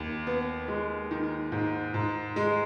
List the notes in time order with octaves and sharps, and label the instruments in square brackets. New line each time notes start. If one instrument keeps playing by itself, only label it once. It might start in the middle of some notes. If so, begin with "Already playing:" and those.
Already playing: [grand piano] D#2
B3
G#3
D#3
G#2
G#2
G#3